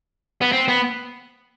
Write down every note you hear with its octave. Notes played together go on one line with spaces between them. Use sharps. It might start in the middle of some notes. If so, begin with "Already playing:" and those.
B3
C4
B3